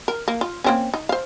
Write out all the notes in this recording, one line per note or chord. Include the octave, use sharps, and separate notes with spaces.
A#4
A#3
F4
A#3 C4 C#4
D#4
C5 F5